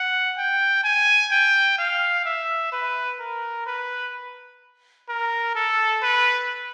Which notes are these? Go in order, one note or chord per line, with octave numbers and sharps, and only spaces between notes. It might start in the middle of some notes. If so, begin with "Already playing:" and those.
Already playing: F#5
G5
G#5
G5
F5
E5
B4
A#4
B4
A#4
A4
B4